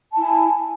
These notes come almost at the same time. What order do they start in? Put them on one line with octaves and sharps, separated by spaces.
A5 E4 G#5